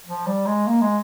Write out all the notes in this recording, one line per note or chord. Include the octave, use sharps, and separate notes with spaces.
F3
G3
G#3
A#3
G#3